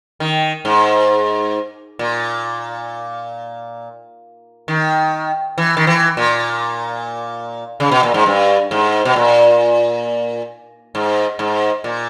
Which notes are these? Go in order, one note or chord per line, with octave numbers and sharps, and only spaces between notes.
D#3
G#2
A#2
D#3
E3
D#3
E3
A#2
C#3
B2
A#2
G#2
G2
G#2
B2
A#2
G#2
G#2
A#2